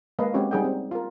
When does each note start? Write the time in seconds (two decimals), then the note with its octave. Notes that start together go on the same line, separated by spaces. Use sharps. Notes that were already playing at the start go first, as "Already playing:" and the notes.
0.19 G#3 A#3 B4 D#5 F5
0.34 G#3 C4 C#4 F#4 G4 C#5
0.51 G3 D#4 G#4 F#5 G5
0.64 C4
0.91 F4 A#4